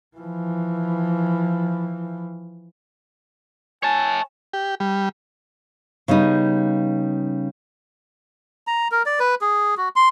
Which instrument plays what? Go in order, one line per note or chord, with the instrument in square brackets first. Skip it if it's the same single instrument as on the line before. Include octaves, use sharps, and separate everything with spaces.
[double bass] E3 F3
[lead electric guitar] C#5 A5 [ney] G#5
[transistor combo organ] G4
G3
[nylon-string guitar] C#3 G3 B3 D#4
[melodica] A#5
A#4
D5
B4
G#4
F#4
C6